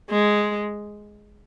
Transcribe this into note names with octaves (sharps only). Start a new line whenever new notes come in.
G#3